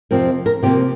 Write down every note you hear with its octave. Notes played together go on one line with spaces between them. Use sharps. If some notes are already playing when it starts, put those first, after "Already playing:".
F2 C3 F3 C4 A#4
A#4
C3 F3 A#3 G4